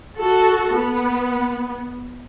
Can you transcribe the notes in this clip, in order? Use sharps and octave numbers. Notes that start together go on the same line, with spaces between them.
F#4 A4
B3